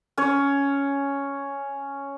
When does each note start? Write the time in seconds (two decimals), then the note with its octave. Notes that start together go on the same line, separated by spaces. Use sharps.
0.18 C#4 C#5